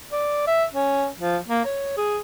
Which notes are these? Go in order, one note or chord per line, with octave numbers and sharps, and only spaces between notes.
D5
E5
C#4
F3
A#3
C#5
G#4